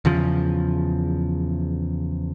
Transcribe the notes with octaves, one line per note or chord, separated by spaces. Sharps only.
E2 C#3 F3